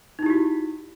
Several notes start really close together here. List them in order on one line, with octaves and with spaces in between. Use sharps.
D#4 E4 G4 F#4